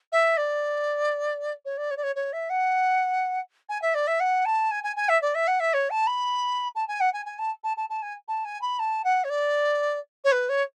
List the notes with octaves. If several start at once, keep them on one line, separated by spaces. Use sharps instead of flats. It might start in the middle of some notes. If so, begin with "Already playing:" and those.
E5
D5
C#5
D5
C#5
D5
C#5
C#5
E5
F#5
G#5
E5
D5
E5
F#5
A5
G#5
G#5
G#5
E5
D5
E5
F#5
E5
C#5
A5
B5
A5
G#5
F#5
G#5
G#5
A5
A5
A5
A5
G#5
A5
G#5
B5
A5
F#5
C#5
D5
C#5
B4
C#5